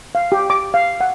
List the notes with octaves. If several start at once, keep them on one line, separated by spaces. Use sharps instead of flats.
F5
G4
D6
F5
F#5